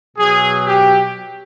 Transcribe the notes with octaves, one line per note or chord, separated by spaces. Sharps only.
B2 F#3 G#4
G4